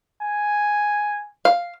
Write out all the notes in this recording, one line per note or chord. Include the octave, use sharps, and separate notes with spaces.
G#5
F5